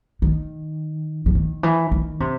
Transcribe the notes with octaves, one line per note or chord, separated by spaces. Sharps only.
D#3
E3
D#3
E3
D#3
C3